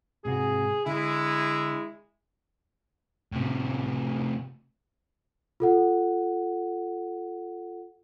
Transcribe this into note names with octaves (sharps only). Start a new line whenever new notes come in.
G#2 C3 F#4 G#4
D3 G#3 E4
A2 C3
F4 A4 F#5